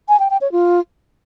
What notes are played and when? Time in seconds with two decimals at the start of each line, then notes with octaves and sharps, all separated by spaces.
0.09 G#5
0.20 G5
0.30 G5
0.41 C#5
0.52 F4